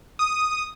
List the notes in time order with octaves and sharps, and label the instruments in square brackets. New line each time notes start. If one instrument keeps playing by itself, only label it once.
[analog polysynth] D#6